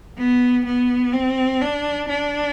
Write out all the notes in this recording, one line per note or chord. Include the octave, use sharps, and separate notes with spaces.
B3
B3
C4
D4
D4